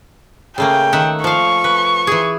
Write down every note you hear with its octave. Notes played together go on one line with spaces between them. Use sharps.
C#3 A3 A#3 G5
D#3 E5 F#5
F3 F5 C#6
B4
E3 G#4